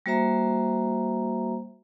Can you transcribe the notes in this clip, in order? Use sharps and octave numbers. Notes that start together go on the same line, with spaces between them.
G3 A#3 F#4 C5 E5 A#5